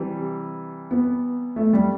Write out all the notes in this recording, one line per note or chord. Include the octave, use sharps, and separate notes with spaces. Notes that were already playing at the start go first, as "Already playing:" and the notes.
Already playing: C3 E3 G3
B3
A3
G3